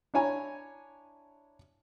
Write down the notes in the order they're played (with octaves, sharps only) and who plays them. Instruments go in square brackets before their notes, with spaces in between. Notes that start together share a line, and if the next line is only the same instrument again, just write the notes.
[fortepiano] D4 E4 C#5 G#5 A#5